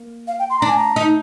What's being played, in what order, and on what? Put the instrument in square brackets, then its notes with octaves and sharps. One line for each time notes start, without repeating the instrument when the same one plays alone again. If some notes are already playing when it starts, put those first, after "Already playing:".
Already playing: [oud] A#3
[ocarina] F5
G5
C6
[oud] D4 [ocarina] A#5
[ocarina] G#5
A#5
[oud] D#4